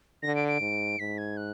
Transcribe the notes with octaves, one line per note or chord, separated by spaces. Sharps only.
D3 A#6
D7
D7
G#2
G#2 B6
G#6
F#6